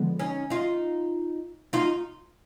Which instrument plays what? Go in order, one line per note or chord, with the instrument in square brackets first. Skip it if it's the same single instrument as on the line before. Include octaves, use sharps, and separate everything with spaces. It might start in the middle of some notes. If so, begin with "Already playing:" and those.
Already playing: [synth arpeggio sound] D3 F3 G#3 B3
[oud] C#4 D#4
D#4 F4
D#4 F4